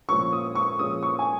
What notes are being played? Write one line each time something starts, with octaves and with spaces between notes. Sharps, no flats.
A#2 F3 C#4 C#6
D#6
C#6
A#2 F3 G#3 C#4 D#6
C#6
G#5